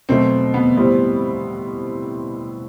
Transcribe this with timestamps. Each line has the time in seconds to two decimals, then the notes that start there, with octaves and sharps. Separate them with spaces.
0.09 B2 F#3 A3 C4
0.54 B3
0.77 A2 G3 C4